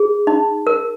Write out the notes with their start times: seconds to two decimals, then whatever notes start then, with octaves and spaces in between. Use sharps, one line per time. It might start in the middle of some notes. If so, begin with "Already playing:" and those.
Already playing: G#4
0.27 D#4
0.67 A#4